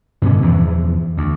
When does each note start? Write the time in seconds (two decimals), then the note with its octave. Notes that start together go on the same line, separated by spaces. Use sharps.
0.22 G2 B2 D3 C#4
0.42 E2 E3 F3
1.18 D2